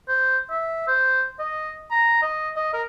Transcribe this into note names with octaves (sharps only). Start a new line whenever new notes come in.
C5
E5
C5
D#5
A#5
D#5
D#5
A#4